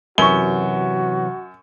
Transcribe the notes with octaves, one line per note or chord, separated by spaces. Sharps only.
F#2 C3 E3 F#3 F#4 C#6 G7